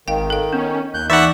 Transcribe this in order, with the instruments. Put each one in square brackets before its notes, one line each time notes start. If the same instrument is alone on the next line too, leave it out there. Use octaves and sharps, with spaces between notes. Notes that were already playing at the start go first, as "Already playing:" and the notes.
[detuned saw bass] G#1 [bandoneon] D#3 [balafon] F5 G5
[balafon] A4 F5
[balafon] B3 [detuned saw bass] C#4
[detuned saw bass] D#2 [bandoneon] F#6 G6
[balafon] E3 D#4 G#5 [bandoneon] D5 C#6 [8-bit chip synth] E5 F#5